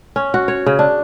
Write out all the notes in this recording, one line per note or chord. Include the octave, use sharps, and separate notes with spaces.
C#4
F#4
C#5
C#3
D4